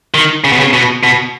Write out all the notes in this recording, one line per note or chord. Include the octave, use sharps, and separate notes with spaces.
D#3
C#3
B2
C#3
B2
B2